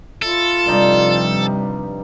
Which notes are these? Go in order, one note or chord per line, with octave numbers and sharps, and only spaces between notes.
E4 F4 A4
G2 C3 F3 G3 D#4 D6